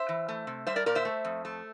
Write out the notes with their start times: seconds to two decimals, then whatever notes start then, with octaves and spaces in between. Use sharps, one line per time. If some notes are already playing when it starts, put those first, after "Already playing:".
Already playing: C5 E5
0.09 E3
0.29 A3
0.47 C3
0.67 G3 C5 E5
0.76 A#4 D5
0.86 A#2 A#4 D5
0.95 C5 E5
1.05 A3
1.25 F2
1.45 A3